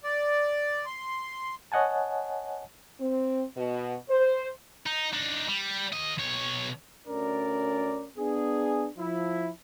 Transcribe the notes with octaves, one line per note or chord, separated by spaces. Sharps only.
D5
C6
C#5 D#5 F#5 G#5 A5
C4
B2
C5
D#4
D4 D#4
G3
D#2 D#5
B1 C#5
D2 C#4 A#4 D5
B3 D4 G#4
F3 E4